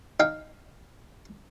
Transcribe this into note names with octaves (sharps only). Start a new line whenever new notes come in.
D#4 F5 G5